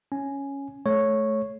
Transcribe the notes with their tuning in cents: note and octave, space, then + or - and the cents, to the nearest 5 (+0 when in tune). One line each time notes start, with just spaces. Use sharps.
C#4 +0 G#5 +5
A3 -25 C#5 -5